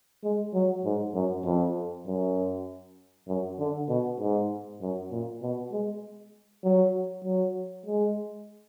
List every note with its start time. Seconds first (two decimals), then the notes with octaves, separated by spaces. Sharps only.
0.24 G#3
0.54 F#3
0.85 G#2
1.14 F#2
1.45 F2
2.07 F#2
3.28 F#2
3.59 D3
3.89 B2
4.20 G#2
4.81 F#2
5.11 A#2
5.42 B2
5.72 G#3
6.64 F#3
7.25 F#3
7.86 G#3